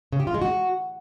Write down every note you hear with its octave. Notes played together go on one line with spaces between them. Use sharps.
C#3
G4
F4
G#3
F#4